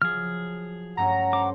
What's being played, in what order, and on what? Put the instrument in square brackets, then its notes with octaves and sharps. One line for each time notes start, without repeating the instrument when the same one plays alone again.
[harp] F3 F#3 [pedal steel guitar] G#4 F6
[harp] G2 A3 C#4 [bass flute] F#5 [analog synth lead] A#5
[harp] A4 C5 [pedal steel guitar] D6